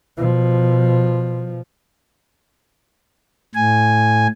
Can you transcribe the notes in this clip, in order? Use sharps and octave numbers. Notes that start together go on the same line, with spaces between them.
B2 F3
A2 G#5